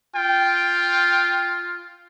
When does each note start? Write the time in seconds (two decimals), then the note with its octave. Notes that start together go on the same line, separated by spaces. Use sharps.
0.15 F4 G5